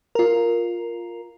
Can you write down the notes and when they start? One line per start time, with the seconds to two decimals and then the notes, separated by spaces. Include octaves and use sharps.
0.15 F4 A#4